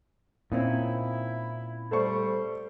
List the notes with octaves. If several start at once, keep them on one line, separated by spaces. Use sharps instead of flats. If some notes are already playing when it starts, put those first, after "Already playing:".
A#2 C4 C#4 D#4 E4
G3 A3 C5 C#6